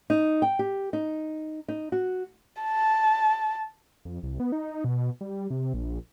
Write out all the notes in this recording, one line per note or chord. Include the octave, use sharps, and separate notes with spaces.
D#4
G5
G4
D#4
D#4
F#4
A5
F2
C2
B3
D#4
B2
G3
C3
A#1